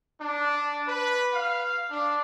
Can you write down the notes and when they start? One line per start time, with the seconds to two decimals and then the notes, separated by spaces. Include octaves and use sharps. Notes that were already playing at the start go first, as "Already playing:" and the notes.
0.20 D4
0.87 B4
1.33 F5
1.90 D4